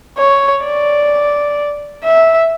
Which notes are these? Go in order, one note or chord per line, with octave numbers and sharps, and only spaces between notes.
C#5
D5
E5